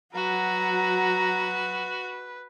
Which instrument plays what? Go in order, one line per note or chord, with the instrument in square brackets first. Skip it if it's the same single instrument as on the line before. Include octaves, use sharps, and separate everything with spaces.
[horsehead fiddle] F#3 [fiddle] F#4 [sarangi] B4 [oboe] A#5